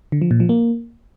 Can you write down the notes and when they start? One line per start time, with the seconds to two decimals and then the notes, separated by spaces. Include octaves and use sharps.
0.12 D3
0.22 F3
0.31 A#2
0.40 F3
0.49 A#3